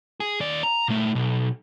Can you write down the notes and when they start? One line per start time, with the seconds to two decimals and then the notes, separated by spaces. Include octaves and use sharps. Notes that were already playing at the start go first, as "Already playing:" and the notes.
0.20 G#4
0.40 D#2 D5
0.63 A#5
0.88 A#2 A3
1.15 B1